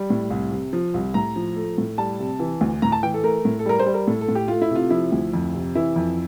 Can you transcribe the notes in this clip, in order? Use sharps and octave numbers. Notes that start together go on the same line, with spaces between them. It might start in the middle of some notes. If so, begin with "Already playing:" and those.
Already playing: G3
A2
C2
C3
F3
C2
A2 A#5
F3
A3
A2
G3 A5
C3
E3
D2
A2 A#5
A5
E3 G5
A4
A3 A#4
A2
A4
G3 A#4
C5
G3
A#4
A2 A4
A4
A2
G4
A3 F4
E4
C3 F4
F3 E4
D2
F2
C3
E3 E4
F2